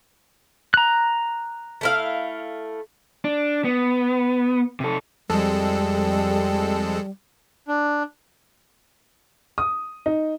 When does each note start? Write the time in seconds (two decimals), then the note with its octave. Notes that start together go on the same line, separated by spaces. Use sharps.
0.74 A#5 F#6
1.81 A3 E4 F5
3.24 D4
3.65 B3
4.80 C3 A4
5.30 F2 G3 G#3 A4
7.68 D4
9.58 D#6
10.06 D#4